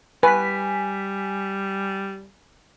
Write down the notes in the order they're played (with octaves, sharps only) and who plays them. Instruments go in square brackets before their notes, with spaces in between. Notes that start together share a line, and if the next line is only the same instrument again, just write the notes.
[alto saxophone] G3 [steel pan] B4 [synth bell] G#5 B6